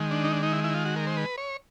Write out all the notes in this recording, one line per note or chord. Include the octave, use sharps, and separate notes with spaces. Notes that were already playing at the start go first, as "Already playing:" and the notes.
Already playing: D#3 G#3
D4
D#4
D4
D#4
E4
E4
F4
F#4
A#4
C5
B4
C#5